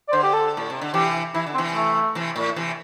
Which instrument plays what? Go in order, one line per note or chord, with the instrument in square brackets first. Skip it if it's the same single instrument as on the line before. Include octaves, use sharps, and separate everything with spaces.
[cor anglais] D5
[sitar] D3 [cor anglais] C5
[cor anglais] G4
A4
[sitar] A2
C3
D3
[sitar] C3 E3 [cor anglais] G4
[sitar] E3 [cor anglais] E4
[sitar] D3
[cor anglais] C4
[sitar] C3 E3
[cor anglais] A3
[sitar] C3 E3
A2
C3 E3